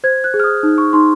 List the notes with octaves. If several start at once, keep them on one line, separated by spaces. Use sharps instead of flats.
C5 G#6
F#6
G#4
F6
D#6
D#4
C#6
D#4 C6